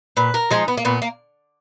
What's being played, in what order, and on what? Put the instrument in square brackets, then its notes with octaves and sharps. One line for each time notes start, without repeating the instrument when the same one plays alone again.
[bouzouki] A#2 B4
A#4
F3 G#3 D#4
B3
A#3
A#2 B3
A#3